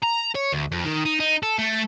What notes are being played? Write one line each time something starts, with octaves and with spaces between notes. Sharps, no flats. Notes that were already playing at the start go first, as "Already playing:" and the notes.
A#5
C#5
D2
F2
D#3
D#4
D#4
A4
A3